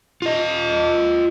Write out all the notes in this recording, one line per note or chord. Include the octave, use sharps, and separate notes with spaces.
F4 D#5